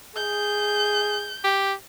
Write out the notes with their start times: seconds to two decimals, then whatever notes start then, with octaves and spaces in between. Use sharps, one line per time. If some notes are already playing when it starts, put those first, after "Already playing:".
0.16 G#4 G6
1.44 G4